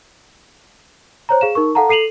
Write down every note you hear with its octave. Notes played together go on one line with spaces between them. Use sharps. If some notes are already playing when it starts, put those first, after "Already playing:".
C5 C#5 A#5
G#4 F5 E7
D#4 A#4 C#6
A4 F5 F#5 A5 A#5
A4 C7 D#7 F7 F#7